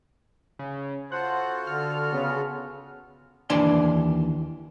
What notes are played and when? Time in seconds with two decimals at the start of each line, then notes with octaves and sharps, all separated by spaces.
0.59 C#3
1.12 F4 F#4 A4 C5 F#5
1.67 D3 F6
2.12 C#3 B3
3.50 D#2 E3 D4 D5 G#5 C6